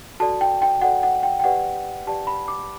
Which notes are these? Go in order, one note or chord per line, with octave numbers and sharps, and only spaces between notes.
F#4 A4 D5 A5
G5
G5
F#4 A4 D5 F#5
F#5
G5
G5
G4 B4 D5 F#5
G4 B4 D5 A5
B5
D6